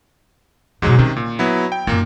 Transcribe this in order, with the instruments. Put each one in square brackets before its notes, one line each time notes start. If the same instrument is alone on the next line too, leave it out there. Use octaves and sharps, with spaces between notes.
[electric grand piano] G#2 F#3 G#3 [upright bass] B2 D3
[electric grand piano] C3 D#3 [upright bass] C#4
[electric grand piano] A#2
F#3 B3 E4
G5
[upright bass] F#2 D#4 [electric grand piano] A#2 A#3